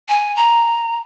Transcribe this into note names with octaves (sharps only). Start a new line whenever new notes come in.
G#5
A#5